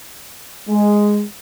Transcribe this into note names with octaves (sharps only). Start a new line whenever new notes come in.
G#3